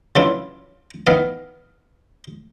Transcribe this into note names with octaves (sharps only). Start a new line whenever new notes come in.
C#3 E3 F#3 D4 E4 F4
D#3 E3 B3 B4 F5